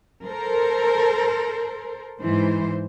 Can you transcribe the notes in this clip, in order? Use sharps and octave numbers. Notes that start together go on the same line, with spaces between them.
A4 A#4 C5
G#2 E3 C5